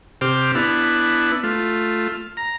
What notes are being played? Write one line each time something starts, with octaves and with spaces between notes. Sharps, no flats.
C3 G4 C5 D6 F6
B3 D4 E4
A3 F4
A#5